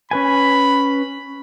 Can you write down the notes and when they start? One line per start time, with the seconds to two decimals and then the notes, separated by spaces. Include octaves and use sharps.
0.11 C#4 B4 G#5 B5